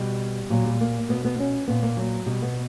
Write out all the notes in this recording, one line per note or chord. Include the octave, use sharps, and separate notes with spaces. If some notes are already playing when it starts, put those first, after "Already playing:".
Already playing: B2 G3
A#2 F#3
G3
A#3
B2 B3
B3
C#4
A#2 B3
A#3
F#3
B2 G3
B3